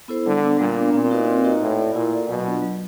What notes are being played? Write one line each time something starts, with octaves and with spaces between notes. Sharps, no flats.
B3 E4 A4 C5
D3 G3
B3 D4
A#2 G3
B3 D4
A#2 C4
D#4 F#4 B4 D#5
C4
D#4 F#4 B4 D#5
A2 E4
A4 D5
A#2 E4
A4 D5
B2 F#3
B3 D4 F4
F#3